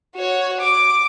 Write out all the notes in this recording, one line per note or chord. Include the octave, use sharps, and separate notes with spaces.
F#4 C#5
D6